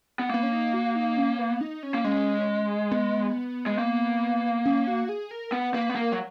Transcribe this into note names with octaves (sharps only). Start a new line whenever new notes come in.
B3
A#3 B3
C#4
D#4
F#4
D#4
C#4
B3
D#4
C#4
A#3
G#3 C#4
B3
G#3
A#3
C#4
F#4
G#4
A#4
B3 B4
A#3 B4
B3
A#3 A#4
F#3